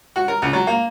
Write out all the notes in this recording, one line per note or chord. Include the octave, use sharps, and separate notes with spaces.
F#4
A#4
C#2
F#3
A#3